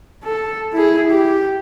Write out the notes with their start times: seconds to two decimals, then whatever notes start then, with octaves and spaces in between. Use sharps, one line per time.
0.24 A4
0.73 E4 G#4
1.10 G4